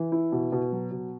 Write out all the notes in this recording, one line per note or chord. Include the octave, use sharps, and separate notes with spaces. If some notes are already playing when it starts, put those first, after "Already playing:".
Already playing: E3
E4
B2
B2
F#3
B2